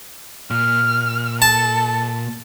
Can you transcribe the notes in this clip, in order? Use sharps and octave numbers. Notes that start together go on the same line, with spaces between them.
A#2 F6
A4 A5